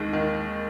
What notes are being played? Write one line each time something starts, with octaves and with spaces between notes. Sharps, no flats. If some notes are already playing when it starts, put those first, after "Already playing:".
Already playing: D#2 D#3 G#3
D#3